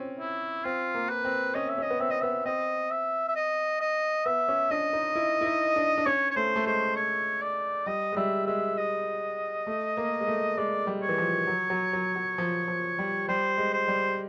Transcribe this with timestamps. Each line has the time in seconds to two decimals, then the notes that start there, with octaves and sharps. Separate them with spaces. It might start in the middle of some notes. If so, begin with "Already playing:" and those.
Already playing: C4 C#4
0.20 E4
0.65 C4 F4
0.95 A#3
1.09 B4
1.25 C4
1.55 C#4 D#5
1.69 E5
1.78 C#4 D#5
1.90 B3
2.00 C4 E5
2.10 D#5
2.21 B3 E5
2.45 C4 D#5
2.91 E5
3.28 E5
3.36 D#5
3.81 D#5
4.25 B3 E5
4.48 C#4
4.71 D4 D#5
4.93 D#4
5.15 E4
5.41 E4
5.46 D#4
5.76 D4
5.98 D4
6.06 C#4 C#5
6.31 C#5
6.36 A3 C5
6.56 A3
6.67 G#3 C5
6.96 C#5
7.42 D5
7.86 G3 D#5
8.12 G#3
8.17 G3 E5
8.46 G#3 E5
8.77 D#5
9.67 A3
9.97 A#3
10.20 G#3
10.28 A3
10.58 G#3 D5
10.87 G3
11.03 C#5
11.09 E3
11.18 F3
11.47 F#3
11.70 F#3
11.93 F#3
12.16 F#3
12.38 F3
12.68 F3
12.99 G3
13.28 G3 C5
13.58 G#3
13.73 C5
13.88 G3